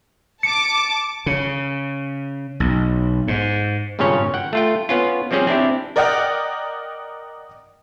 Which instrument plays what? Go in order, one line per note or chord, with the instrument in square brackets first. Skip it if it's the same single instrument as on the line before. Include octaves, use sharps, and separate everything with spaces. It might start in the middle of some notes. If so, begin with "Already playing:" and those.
[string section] A5 D6 [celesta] C#7
[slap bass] C#3
B1
G#2
[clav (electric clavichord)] G#1 G2 A#2 C#3 C#4 C#5
F#5 G5
A3 F4 G5
B3 C#4 F4
F3 G3 C4 C#4 G#4
C4 D4 E4 G4
[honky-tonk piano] A#4 D5 D#5 F#5 G5 F6